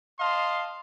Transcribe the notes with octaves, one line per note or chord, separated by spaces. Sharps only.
D#5 F5 A5 C6